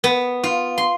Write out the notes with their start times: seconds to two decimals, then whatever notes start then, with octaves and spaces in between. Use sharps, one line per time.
0.04 B3
0.43 F4
0.78 C6